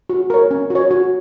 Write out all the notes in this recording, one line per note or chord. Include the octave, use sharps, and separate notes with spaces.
F#4
A#4 C#5
C#4
F#4
C#5
F#4